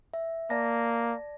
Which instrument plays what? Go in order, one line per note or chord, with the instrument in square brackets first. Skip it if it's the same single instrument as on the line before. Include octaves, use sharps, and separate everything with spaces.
[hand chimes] E5
[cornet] A#3 [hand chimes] D5 A5 A#6